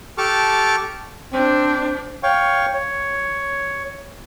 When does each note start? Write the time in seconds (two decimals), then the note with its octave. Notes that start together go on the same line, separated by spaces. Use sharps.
0.18 G4 A4 A5 C#6 D6 F6
1.33 C4 D4 C5
2.23 C#5 F5 G5 C#6
2.74 C#5